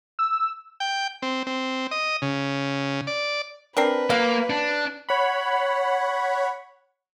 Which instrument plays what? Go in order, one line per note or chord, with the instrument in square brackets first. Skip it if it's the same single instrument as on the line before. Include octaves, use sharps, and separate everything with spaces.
[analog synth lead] E6
[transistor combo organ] G5
C4
C4
D#5
C#3
D5
[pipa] C4 D4 A#4 [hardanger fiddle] B4
[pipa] F#3 F5 [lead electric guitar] A#3
[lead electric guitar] D4
[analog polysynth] C#5 F#5 B5